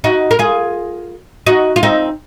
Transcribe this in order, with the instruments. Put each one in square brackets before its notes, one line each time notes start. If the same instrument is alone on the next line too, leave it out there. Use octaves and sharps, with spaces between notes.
[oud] D#4 F#4
A#4
F4 G#4
D#4 F#4
F4
C4 D#4